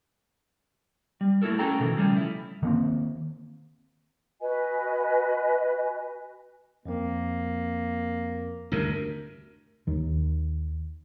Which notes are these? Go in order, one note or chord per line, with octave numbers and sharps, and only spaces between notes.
G3
A3 E4 F#4 A4 A#4
C#4 F#4 G#4 A4 G5 A#5
B2 D#3 E3
C#3 F3 G3 A3 C#4
E4
D#3 A#3 C4
F#4 B4 D#5 G#5
F2 F3 A#3 C4
D2 G2 C3 A#4
D#2 D#3